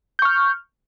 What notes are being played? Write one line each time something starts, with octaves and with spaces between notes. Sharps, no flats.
C#6 F6 G6